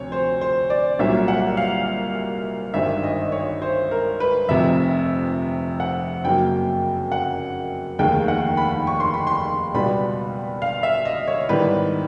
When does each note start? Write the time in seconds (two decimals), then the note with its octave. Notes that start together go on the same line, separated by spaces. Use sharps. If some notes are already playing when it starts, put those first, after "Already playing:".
Already playing: D2 C3 F3 C#5
0.12 C5
0.41 C5
0.70 D5
0.99 C2 A#2 F#3 A#3 C#4 E5
1.28 F#5
1.57 F5
2.74 G#1 G2 D#3 E5
3.03 D#5
3.32 C#5
3.62 C5
3.91 A#4
4.20 B4
4.49 F1 F2 C3 E5
5.80 F#5
6.24 F#2 C#3 F#3 A#3 G5
7.12 F#5
7.99 F1 D#2 D#3 G#3 G5
8.28 F#5
8.57 B5
8.87 C#6
9.00 C6
9.14 B5
9.27 C6
9.74 C#2 B2 G3 B3 B5
10.62 F5
10.83 E5
11.05 D#5
11.27 C#5
11.49 G#2 D#3 G3 B3 E4 B4